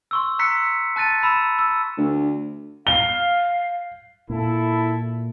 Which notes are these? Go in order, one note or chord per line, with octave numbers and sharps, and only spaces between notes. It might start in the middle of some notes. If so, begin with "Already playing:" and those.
C6 C#6 E6
A#5 E6 F#6 B6 C#7
A5 F#6 A6 D#7
B5 E6 E7
E6
D2
F5 G7
A#2 E4 A4